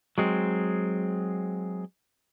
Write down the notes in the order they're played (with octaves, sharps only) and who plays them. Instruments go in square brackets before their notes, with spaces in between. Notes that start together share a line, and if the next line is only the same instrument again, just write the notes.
[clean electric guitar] F#3 G#3 C4